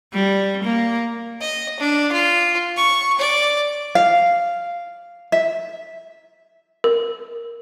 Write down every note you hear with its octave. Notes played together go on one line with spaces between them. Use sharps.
G3
A#3
D#5
D4
F4
C#6
D5
F5
E5
A#4